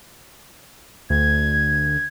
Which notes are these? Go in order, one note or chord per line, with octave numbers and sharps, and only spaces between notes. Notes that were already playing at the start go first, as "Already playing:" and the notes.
D2 G#6